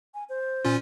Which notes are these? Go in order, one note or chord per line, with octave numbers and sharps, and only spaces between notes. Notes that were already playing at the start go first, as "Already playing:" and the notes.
G#5
C5
A#2 C#4 F4